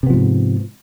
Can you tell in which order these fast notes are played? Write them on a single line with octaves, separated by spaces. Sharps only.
C3 B3 F3 G#2